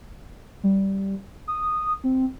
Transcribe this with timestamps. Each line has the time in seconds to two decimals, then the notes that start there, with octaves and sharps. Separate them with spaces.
0.63 G3
1.48 D#6
2.04 C4